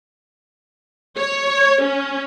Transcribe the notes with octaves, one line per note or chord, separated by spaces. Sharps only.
C#5
C#4